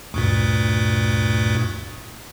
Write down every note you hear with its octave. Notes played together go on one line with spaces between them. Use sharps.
D2 G2 A#2